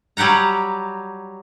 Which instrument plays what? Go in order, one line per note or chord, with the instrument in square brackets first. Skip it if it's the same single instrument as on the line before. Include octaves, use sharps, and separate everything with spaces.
[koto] F#3 G3 G4 F#5 A#5